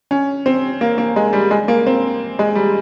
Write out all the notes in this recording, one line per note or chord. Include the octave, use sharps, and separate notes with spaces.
C#4
C4
A#3
A#3
G#3
G3
G#3
A#3
C4
G#3
G3